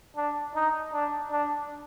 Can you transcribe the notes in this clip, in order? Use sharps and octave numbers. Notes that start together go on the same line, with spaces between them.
D4
D#4
D4
D4